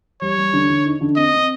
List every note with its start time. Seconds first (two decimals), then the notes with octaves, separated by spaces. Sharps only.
0.21 G3 C#5
0.38 G3
0.53 D3
0.70 D3
0.85 D#4
1.01 D3
1.16 C4 D#5
1.33 C4